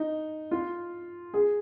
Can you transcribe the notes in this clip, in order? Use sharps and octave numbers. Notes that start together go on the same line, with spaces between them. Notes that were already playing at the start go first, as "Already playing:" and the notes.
Already playing: D#4
F4
G#4